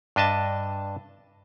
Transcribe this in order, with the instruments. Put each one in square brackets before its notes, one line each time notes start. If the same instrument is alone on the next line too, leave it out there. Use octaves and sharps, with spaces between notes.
[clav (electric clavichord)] G2 D4 D#5 E5 A5